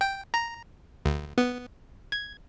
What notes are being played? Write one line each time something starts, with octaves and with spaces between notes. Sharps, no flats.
G5
A#5
D2
B3
G#6